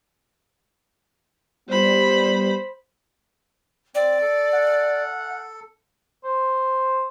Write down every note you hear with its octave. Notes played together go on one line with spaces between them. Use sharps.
G3 B3 C5 B5
C4 D5
A4
F#5
C5